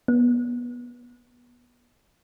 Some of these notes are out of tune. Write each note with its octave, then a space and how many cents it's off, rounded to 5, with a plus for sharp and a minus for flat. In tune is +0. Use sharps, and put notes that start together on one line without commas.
B3 -25